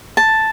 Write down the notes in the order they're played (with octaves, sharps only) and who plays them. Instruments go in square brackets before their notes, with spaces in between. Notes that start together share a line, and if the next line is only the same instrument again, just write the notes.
[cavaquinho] A5